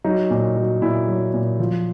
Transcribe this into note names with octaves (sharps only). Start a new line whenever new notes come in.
F#3 D#4
A#2
F#3
A#2 E4
F#3
A#2
F3